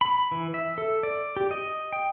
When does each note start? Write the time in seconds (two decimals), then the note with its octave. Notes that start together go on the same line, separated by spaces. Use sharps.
0.01 B5
0.32 E3
0.54 E5
0.78 A4
1.03 D5
1.37 G4
1.51 D#5
1.92 G5